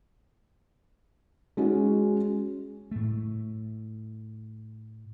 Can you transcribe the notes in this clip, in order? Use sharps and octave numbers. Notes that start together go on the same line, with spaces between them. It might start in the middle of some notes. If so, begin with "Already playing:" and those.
G#3 C#4 F#4
A2 A3